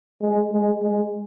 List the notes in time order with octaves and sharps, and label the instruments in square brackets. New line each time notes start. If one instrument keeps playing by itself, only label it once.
[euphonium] G#3
G#3
G#3